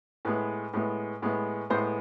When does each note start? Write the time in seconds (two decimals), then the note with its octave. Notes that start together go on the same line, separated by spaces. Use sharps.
0.25 A2 G#3 B3 B4
0.73 A2 G#3 B3
1.22 A2 G#3 B3
1.70 A2 G#3 B3 C5